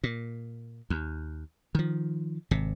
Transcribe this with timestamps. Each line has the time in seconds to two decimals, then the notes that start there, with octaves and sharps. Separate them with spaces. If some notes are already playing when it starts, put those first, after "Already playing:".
0.04 A#2
0.90 D#2
1.75 D#3 F3
2.51 G#1 C3